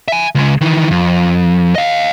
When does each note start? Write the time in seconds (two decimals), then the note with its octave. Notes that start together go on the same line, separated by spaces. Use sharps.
0.08 E5 G#5
0.35 C#2 G#3
0.61 D#3 E3
0.91 F2
1.75 D#5 F5